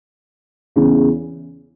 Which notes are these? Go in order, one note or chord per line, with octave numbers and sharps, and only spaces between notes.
E2 C#3 E3